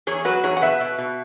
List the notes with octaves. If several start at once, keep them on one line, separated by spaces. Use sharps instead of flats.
E2 G#4 C#5
F#3 F#4 B4
E2 G#4 C#5
F#5
B2 B4 E5
B2
B2